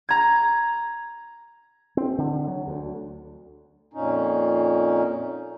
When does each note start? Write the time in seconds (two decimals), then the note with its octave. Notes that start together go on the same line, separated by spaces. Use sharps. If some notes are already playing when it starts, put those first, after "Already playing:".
0.09 A#5 G#6
1.97 C4
2.18 D3
2.47 F#3
2.67 D2
3.94 F2 A#2 C#4 D#4